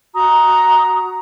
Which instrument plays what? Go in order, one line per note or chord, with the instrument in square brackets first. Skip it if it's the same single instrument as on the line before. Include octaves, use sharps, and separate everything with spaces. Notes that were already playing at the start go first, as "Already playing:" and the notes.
[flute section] F#4 A#5 D#6